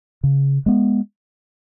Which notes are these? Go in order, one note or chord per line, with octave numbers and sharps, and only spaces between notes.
C#3
G#3 B3